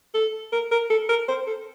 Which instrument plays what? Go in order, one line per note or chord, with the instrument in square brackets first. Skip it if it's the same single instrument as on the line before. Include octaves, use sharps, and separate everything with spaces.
[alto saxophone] A4
A#4
A#4
A4
A#4
C5
A4